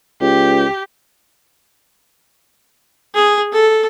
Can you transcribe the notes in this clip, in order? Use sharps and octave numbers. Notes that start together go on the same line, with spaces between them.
C#2 G4
G#4
A4